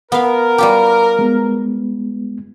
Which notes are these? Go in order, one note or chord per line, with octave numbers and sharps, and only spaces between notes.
B3 A#4 F5
G3 F4 G4
G#3 B3